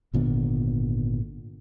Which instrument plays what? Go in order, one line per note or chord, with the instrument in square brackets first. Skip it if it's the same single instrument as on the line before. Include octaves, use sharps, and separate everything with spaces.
[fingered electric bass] G#1 A#2 D3 B3